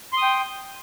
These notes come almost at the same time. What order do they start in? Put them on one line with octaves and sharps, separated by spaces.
C6 D#6 G5